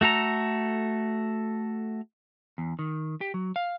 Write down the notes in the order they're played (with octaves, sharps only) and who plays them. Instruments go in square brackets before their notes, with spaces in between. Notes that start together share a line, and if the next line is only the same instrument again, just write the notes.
[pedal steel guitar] A3 F#4 A4 A#5
[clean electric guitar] E2
D#3
G4
F#3
F5